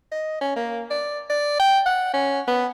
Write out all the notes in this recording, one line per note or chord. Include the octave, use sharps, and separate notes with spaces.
D#5
C#4
A#3
D5
D5
G5
F#5
C#4
B3